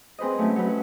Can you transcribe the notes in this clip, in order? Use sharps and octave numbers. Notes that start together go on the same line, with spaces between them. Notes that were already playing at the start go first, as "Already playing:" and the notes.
C4 G#4 B4 C5 D#5
F#3 A3 C#4 E4
F#3 C#4 B4
F#4